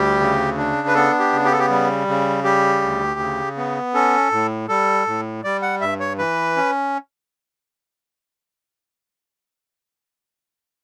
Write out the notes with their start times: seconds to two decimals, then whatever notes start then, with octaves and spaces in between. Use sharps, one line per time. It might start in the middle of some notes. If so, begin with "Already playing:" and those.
Already playing: D2 G3 G4
0.20 C#3
0.57 D4
0.88 B4
0.95 B3 A4
1.20 G4
1.33 C#3
1.45 G4
1.52 A4
1.59 G4
1.70 G3
2.07 C#3
2.44 G3 G4
2.82 D2
3.20 C#3
3.57 B3
3.94 C#4 A4
4.32 A2
4.68 G3 A4
5.07 A2
5.44 G3 D5
5.62 F#5
5.81 G2 E5
6.00 C#5
6.18 E3 B4
6.57 C#4